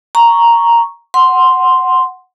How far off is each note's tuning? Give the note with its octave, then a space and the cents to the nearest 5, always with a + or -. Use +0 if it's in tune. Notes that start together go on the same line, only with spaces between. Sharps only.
A#5 +0 C#6 +0
F#5 +0 C6 +0